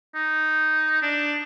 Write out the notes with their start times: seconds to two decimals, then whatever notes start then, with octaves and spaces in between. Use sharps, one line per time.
0.15 D#4
1.02 D4